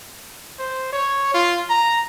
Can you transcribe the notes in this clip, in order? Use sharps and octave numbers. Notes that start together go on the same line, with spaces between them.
C5
C#5
F4
A#5